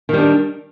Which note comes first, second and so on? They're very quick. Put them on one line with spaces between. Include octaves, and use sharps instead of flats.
D#3 G3 D4